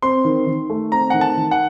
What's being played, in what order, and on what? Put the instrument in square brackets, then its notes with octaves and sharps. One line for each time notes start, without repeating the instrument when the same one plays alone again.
[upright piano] C4 [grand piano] C6
[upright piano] D#3
D#3
A3
[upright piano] C4 [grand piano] A#5
[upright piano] D#3 [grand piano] F#5
[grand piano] A5
[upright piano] D#3
[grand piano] F#5